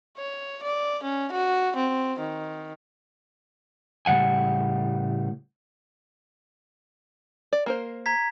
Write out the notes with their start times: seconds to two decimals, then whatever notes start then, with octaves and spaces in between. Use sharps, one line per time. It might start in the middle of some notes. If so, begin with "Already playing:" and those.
0.17 C#5
0.63 D5
1.03 C#4
1.32 F#4
1.76 C4
2.20 D#3
4.06 A2 C#3 G3 F#5 G#5
7.53 D5
7.66 A#3 A#4 C5
8.06 A#5 G#6 B6